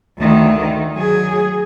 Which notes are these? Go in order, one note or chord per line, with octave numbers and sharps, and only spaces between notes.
D2 D#3
F#3 G#4